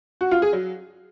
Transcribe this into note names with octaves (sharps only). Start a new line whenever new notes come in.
F#4
F4
G#4
F#3